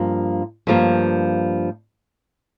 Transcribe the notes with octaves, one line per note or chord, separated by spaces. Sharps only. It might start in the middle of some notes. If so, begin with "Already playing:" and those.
Already playing: G2 F3 A#3
G2 F3 A#3